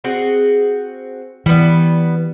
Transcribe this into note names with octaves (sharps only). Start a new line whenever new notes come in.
C4 F#4 G#4
E3 G3 B3